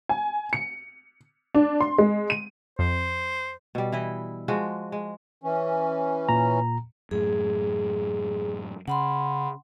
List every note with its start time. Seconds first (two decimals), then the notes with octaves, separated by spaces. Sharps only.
0.09 G#5
0.53 C#7
1.55 D4
1.81 C6
1.98 G#3
2.30 D#7
2.79 F2 C5
3.75 B2 G3
3.92 E3 E4 D#5
4.48 F3 G#3 F#4
4.92 G#3
5.44 E3 C#4
6.29 A#2 A#5
7.11 F#2 A2 G#4
8.88 C#3 F#5 B5 C6